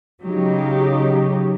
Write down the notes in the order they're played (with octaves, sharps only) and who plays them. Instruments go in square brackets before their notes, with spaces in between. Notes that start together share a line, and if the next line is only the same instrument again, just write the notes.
[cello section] C#3 F#3 D#4 G4